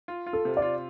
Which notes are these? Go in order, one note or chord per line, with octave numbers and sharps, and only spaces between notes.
F4
F4
A4
C3
D5
F4